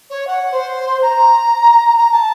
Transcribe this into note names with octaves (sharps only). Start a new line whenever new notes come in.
C#5
F#5
C5
A#5
A#5
A5